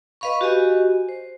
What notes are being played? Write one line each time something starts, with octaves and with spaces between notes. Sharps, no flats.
B4 D#5 F5 B5 C#6
F#4 G4 D#5 G#5
C5